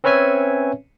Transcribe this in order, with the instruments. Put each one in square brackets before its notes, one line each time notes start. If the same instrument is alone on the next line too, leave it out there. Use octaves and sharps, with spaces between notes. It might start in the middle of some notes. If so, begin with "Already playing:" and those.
[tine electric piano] C4 C#4 B4 C#5 E5 G#5